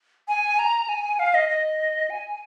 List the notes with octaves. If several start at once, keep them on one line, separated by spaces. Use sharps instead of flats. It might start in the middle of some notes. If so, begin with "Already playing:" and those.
G#5
A#5
G#5
F5
D#5
D#5
G#5